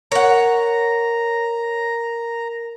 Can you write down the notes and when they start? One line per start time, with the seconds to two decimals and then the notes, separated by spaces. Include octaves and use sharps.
0.12 A#4 C#5 F#5 A#5